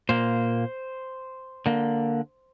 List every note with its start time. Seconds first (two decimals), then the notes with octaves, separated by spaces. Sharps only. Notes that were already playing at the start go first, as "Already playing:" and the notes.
0.09 A#2 A#3 C5
1.66 D3 A#3